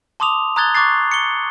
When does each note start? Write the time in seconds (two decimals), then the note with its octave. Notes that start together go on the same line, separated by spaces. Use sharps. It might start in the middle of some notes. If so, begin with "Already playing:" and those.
0.20 A5 C6 D6 D#6 F7
0.56 A#5 D#6 F#6 G#6 A6 G7
0.75 C#6 D6 F#6 A6 C7
1.11 C#7 G7